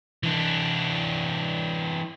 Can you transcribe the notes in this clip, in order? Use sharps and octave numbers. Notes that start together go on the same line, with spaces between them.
E3 D4